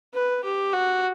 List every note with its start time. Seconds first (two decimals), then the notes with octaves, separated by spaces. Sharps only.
0.14 B4
0.44 G4
0.73 F#4